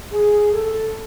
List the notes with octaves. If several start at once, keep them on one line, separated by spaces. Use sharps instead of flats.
G#4
A4